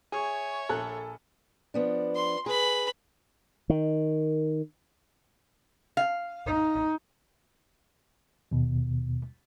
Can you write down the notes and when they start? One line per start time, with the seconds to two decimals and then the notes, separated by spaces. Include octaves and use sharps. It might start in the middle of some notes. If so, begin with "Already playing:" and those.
0.12 G#4 C#5 E5 G#5 C#6
0.69 A#1 A4 G#5 F#6
1.74 F3 B3 D4
2.15 C6
2.46 G#4 B4 B5
3.70 D#3
5.97 F5
6.46 D#4
8.51 D#2 B2